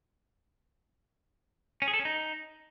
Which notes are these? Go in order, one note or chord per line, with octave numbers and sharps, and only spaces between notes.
C#4
G#4
A4
C#4
D#4